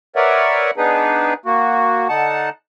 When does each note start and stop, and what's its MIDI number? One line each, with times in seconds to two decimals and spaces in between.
0.16 0.71 70
0.16 0.71 71
0.16 0.71 73
0.16 0.71 74
0.16 0.71 76
0.16 0.71 78
0.77 1.34 59
0.77 1.34 62
0.77 1.34 63
0.77 1.34 68
0.77 1.34 71
1.46 2.08 58
1.46 2.08 66
2.09 2.50 50
2.09 2.50 63
2.09 2.50 78
2.09 2.50 81